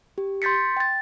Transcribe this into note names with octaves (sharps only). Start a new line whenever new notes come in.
G4
C6 G6 A6 B6 C#7
G5 A6